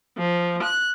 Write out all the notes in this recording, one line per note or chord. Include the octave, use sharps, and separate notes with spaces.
F3
F#6